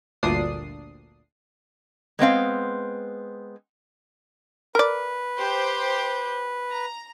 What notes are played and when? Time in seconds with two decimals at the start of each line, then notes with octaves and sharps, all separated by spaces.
0.23 G1 D2 A#2 D4 D#6 C7
2.19 G#3 B3 C4 F5
4.75 A#4 B4 D5
5.38 G4 C5 G6
6.71 A#5